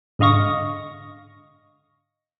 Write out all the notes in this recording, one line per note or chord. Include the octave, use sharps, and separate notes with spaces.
G#2 D3 D#5 F5 C#6 A#6